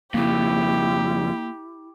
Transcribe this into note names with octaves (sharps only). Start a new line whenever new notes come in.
F2 C#3 A#3 E4 G4